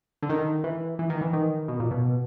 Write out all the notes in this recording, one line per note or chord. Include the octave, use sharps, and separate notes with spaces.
D3
D#3
E3
E3
D#3
E3
D#3
B2
A#2
B2